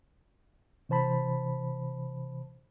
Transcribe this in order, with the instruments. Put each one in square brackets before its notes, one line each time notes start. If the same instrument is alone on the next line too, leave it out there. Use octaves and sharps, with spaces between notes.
[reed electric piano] C3 E3 C5 A5 B5